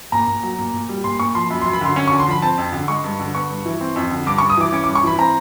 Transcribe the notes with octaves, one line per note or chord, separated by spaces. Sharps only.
A#2 A#5
A#2
F#3
A#2
A#2
G3
A#2 C6
A#2 C#6
F3 C6
F#2 B5
C6
F#2
B5
D3 C6
C#4
C#6
D3
C6
F3 B5
C4 A5
F2
D3
G#3 C#6
G2
D3
B3 C#6
G2
E3
C4
F2
D3
G2 D6
C#6
G2
D#6
E3 D6
C#4 D6
D6
G2
C#6
E3 B5
C4 A#5